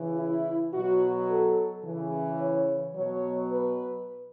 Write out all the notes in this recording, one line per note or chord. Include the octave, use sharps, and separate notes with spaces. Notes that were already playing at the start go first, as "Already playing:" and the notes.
Already playing: C#3 E3
E4
B2 F#3 F#4
A4
C#3 E3
C#5
B2 F#3 C#5
B4